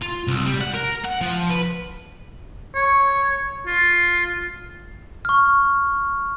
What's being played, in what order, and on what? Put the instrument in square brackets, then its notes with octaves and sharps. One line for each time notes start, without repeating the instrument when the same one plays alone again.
[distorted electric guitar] F4
C2
G3
F#5
A#4
F#5
F3
B4
[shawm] C#5
F4
[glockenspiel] C#6 F6